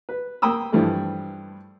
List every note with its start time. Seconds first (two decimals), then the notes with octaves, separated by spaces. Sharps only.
0.09 B4
0.42 A#3 G5 B5 D#6 E6
0.72 G2 E3 F3 G3 A3